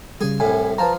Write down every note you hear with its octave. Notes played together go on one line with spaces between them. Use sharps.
C#3 G3 G#4
C2 A2 G#5
F3 B4 A5 A#5